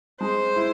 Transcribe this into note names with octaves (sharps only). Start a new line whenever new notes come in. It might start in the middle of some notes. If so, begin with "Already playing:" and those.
G#3 C5
E4